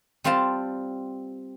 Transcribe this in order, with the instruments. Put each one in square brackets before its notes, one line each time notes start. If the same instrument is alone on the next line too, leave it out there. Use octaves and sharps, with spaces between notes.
[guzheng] G3 C4 F4 C5 A5